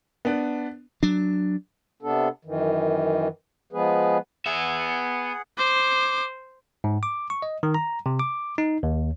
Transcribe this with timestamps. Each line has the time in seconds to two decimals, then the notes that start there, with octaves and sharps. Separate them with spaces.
0.25 B3 D4
1.03 F#3 D4
2.02 C3 B3 D4 A4
2.45 F#2 D#3 E3
3.73 F3 G#3 B3 G#4 B4
4.46 B3 G#4 E5 F#5
5.58 C5 D6
6.84 G#2
7.03 D6
7.30 C#6
7.42 D#5
7.63 D#3
7.75 A#5
8.06 C3
8.20 D6
8.58 D#4
8.83 D#2